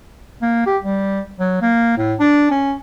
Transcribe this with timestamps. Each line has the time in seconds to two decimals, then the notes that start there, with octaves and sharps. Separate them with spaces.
0.42 A#3
0.66 G4
0.82 G3
1.39 F#3
1.62 A#3
1.98 A2
2.19 D4
2.51 C#4